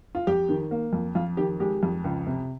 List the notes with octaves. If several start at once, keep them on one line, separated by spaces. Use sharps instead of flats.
F4
F2 G4
D#3
A#3
F2
F2 F4
D#3 G4
G#3 G4
F2
C#2
C3